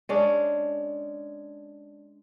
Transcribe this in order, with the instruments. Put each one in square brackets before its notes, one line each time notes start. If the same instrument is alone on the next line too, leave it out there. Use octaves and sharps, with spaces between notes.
[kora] G#3 C#4 D4